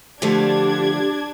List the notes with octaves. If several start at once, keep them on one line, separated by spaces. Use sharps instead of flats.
D3 F3 A3 D4 G4 G#6